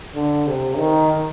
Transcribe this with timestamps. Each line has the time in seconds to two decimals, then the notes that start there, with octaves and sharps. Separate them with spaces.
0.16 D3
0.47 C3
0.78 D#3